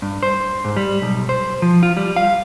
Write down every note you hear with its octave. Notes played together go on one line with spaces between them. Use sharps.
G2
C5
G#2
G3
B1
C5
F3
F4
G3
F5